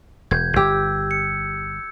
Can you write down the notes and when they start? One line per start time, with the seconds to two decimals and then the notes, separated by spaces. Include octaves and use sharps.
0.31 E1 G6 G#6
0.56 G1 G4 E6
1.11 C#7